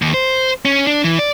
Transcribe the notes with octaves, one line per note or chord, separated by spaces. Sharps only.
D#2
C5
C#4
D4
E3
D5